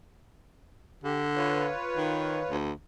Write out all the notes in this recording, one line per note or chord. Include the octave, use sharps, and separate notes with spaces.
D3 G4
F4 B4 C#5
D#3
D2